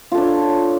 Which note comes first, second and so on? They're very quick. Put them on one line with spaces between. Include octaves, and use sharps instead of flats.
F4 A4 D4 C#5